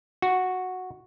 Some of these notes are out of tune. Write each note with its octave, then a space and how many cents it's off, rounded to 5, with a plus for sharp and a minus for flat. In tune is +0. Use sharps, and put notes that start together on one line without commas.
F#4 -5